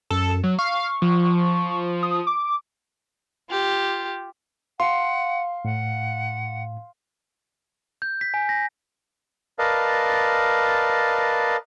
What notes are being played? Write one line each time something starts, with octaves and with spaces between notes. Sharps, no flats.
F#2 A4
F#3
F5 C#6
F3
D#6
D6
F4 G4
F5 F#5 C6
A2 F#5
G6
B6
G#5
A#6
A#4 B4 D5 D#5 F5 A5